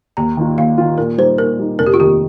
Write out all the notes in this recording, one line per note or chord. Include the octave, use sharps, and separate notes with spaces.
D#2 A#5
D#3 A#3 F4
D#2 F5
D#3 A#3 F4
A#2 A#4
G3 D#4 C5
A#2 A#4
G3 D#4
F1 A#4
G4
F4
D#2 D#3 G4